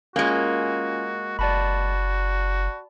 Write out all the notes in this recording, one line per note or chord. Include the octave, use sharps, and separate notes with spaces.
G#3 A#3 C#4 F4 F#4
F#1 F#4 D5 A5 B5